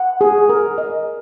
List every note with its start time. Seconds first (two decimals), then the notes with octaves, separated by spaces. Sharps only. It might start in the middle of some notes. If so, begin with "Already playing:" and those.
Already playing: F#5
0.21 G#4
0.49 A#4
0.78 D#5